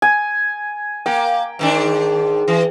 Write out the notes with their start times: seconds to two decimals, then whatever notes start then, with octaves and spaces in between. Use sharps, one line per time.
0.02 G#5
1.06 A#3 G5
1.59 G#2 D#3 D4
2.48 E3